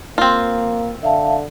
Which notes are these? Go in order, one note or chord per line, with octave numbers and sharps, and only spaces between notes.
A#3 C4 F4
D3 E5 F5 A5